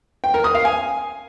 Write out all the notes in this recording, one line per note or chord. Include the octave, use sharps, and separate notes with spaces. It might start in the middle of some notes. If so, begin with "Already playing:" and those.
G5
A#4
D#6
F5
G#5